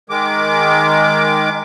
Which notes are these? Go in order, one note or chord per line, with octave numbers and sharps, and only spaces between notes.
D#3 G#3 D6